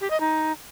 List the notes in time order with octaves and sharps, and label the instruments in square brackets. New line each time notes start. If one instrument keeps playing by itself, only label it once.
[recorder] G4
D#5
D#4